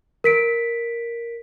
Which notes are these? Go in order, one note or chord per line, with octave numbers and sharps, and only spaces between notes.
A#4 B6 D7